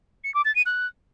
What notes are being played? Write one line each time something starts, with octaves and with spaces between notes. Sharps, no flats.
C#7
D6
A6
D#7
F#6